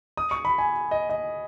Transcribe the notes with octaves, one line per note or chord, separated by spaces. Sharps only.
D#6
C#6
B5
G#5
D#5
D#5